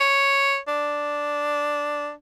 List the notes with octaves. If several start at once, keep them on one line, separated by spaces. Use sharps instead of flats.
C#5
D4